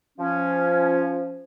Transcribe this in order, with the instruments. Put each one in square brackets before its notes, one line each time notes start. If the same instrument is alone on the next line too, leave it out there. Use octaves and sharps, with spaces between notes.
[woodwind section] F3 C#4